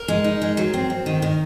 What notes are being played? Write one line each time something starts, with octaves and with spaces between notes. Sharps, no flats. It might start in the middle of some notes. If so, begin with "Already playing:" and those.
Already playing: A#4
G#3
D#4
G#3
F#3
C4
C4
D#3
D#3 A#4